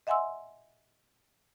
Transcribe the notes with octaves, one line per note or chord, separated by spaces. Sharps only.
D#5 E5 F#5 G#5 C6 E6